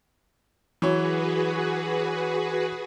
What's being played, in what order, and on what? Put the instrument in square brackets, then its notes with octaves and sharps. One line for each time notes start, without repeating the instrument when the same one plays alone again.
[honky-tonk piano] E3 F#3 C#5 [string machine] F#4 G#4 B4